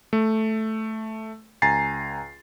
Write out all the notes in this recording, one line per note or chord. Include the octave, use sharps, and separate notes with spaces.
A3
C#2 G#5 A#5 A6 C7